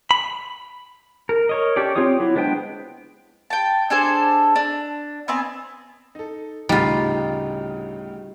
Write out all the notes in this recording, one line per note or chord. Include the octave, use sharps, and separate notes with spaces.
B5
A#4
A#4 C#5 D#5
C#4 G4 A4 D5
C4 F4 G4 C#5 D#6
F#3 E4
G#3 B3 D4 C5 G5
G5 A5
D4 G#4 A4 C5
D4
B3 C4 G#5
D#4 A4
D2 A2 C#3 G3 D#4 F4